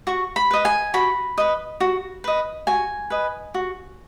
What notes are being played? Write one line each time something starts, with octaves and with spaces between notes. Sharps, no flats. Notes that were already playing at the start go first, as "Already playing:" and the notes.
F#4 C#6
B5
B4 D#5
G#5
F#4 B5
B4 D#5
F#4
B4 D#5
F#4 G#5
B4 D#5
F#4